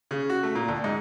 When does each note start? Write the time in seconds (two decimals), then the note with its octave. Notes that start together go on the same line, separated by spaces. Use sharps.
0.11 C#3
0.30 F#4
0.43 A3
0.55 A#2
0.68 D2
0.84 G#2